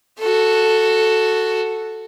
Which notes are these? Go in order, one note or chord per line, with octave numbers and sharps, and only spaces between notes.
F#4 A4